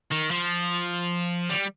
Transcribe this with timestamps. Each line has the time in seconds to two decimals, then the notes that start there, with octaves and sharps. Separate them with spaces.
0.11 D#3
0.31 F3
1.50 G3